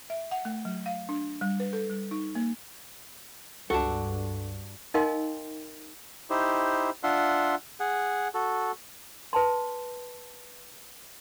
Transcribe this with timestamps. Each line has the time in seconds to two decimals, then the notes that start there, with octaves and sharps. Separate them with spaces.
0.10 E5
0.31 F#5
0.45 A3
0.65 F#3
0.86 F5
1.09 D4
1.41 G3
1.60 B4
1.73 A4
1.90 G3
2.11 D#4
2.35 A#3
3.70 C#2 G2 D4 F#4 A4 A5
4.94 D#4 A#4 D#5 F5 G5 C6
6.30 D#4 E4 G4 C5
7.03 D4 F4 E5 F#5 C6
7.80 G#4 F#5
8.34 F#4 A4
9.33 B4 A5 C6